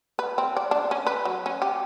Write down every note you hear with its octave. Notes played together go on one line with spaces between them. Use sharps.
B4
C4
D5
D4
C#4
B4
F#3
C#4
G4